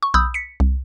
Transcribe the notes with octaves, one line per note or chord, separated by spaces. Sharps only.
C#6
B1 B5 D#6 E6 G6
B6 C#7
C2